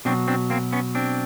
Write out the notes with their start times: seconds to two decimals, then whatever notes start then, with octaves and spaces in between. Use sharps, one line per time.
0.05 B2 F#3 C4 D4
0.28 C4 D4
0.50 A#3 C4
0.73 B3 C#4
0.95 C4 D4